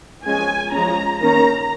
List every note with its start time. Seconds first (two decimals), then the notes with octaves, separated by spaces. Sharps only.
0.26 F3 G#3 C#4 G#5
0.73 F3 G#3 C#4 A#5
1.21 D#3 A#3 C#4 A#5